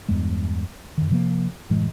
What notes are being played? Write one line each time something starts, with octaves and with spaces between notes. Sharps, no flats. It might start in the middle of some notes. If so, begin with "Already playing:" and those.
E2 G2 G#3
F#2 D#3
C3 F3 F#3 A#3
F#1 A2 E3 G#3